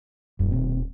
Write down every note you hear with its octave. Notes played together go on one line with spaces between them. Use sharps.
D#1 F#2
B2 C4